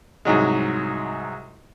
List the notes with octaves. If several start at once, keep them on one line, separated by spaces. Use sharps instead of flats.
C2 G#2 F#3 G#3